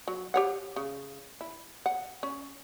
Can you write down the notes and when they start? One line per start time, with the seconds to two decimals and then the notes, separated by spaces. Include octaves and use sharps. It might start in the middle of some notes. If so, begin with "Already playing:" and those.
0.08 F#3
0.34 G4 C#5 F#5
0.76 C#3
1.41 E4
1.86 F#5
2.23 C#4